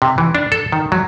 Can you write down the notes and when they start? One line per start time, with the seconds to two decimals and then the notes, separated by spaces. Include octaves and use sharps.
0.02 C3
0.18 E3
0.35 D4
0.52 A4
0.72 D#3
0.92 F#3